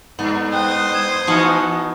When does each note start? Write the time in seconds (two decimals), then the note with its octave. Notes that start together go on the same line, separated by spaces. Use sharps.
0.19 G2 B3
0.53 C5 G5 D#6 F#6
0.94 G#6 E7
1.27 E3 B3 D#4 F#4 G#5 A5 F6